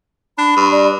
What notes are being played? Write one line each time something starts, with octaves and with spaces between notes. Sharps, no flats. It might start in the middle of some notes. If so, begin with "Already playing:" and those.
D4 B5
G2
D5